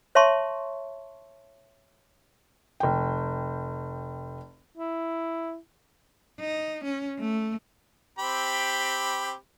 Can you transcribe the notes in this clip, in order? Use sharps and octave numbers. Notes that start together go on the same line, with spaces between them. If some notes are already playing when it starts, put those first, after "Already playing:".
C#5 E5 A5 C6 C#6
F1 G5
E4
D#4
C#4
A3
C4 G4 B5